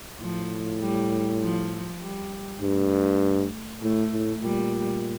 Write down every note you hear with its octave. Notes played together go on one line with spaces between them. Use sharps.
A2 F3
G3
F3
G3
G2 A3
A2 A3
A2
A#2 G3